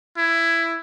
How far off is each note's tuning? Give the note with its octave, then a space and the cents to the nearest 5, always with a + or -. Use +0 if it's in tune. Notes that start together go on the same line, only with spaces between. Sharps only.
E4 +10